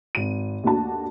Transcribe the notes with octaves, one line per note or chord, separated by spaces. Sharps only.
G#1 D#7
D#2 A3 D4 F#4 A5